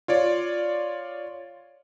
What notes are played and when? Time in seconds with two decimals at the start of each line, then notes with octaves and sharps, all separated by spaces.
0.08 F4 C#5 D5